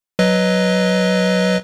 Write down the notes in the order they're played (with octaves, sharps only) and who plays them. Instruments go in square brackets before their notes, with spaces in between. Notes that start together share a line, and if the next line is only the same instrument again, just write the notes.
[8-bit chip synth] F#3 B4 D#5